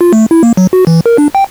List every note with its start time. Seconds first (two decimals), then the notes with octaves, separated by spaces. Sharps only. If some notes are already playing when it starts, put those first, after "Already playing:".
0.01 F4
0.13 A3
0.31 E4
0.43 A#3
0.57 F#3
0.73 F#4
0.87 E3
1.06 A#4
1.18 D4
1.35 G5